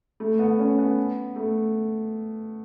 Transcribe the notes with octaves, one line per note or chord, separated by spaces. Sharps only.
A3
B3
C#4
B3
A3